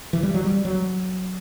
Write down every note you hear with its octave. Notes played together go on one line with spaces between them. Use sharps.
E3
G3
F#3
G3
F#3